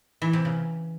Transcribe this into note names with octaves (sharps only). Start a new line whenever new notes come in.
E3
C3
C#3